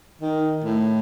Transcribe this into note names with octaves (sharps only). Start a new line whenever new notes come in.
D#3
A2